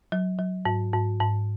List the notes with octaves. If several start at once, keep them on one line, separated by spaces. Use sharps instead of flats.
F#3
F#3
G#2
G#2
G#2